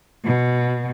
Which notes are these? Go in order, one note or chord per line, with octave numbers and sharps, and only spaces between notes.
B2